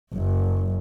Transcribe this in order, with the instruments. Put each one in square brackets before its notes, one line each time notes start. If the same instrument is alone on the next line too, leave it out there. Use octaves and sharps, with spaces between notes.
[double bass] F#1 F#2